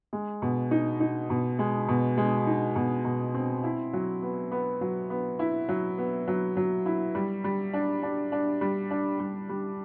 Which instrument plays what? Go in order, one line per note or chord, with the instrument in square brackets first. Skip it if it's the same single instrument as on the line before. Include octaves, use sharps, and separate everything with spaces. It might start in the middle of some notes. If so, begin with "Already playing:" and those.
[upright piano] G#3
B2
D#4
D#4
B2
G#3
B2
G#3
D#4
B2
B2
C4
E4
F#3
B3
B3
F#3
B3
E4
F#3
B3
F#3
F#3
E4
G3
G3
D4
D4
D4
G3
D4
G3
G3